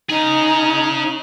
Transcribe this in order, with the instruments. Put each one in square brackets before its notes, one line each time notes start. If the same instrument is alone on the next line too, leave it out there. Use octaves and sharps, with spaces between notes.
[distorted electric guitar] C#4 G#4 [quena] D#4